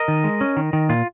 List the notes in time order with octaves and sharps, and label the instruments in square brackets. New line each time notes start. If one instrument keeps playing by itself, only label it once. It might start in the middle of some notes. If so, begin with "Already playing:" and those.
Already playing: [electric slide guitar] A#4 D#5
D#3
G#3
C#4
D#3
D#3
A#2 F4